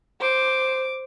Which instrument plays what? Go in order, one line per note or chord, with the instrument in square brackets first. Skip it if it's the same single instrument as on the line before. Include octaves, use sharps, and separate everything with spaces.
[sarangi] C5 [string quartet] D6